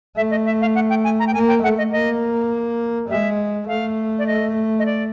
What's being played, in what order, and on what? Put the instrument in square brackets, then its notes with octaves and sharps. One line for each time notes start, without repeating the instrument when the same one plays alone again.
[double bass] A3 [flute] E5
[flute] D#5
E5
F5
F#5
G5
G#5
A#5
G5
[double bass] A#3 [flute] G#5
[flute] G5
[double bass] A3 [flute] F#5
[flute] D#5
[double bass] A#3 [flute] D#5
[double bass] G#3 [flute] E5
[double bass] A3 [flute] F5
[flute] D5
D#5
D#5
D5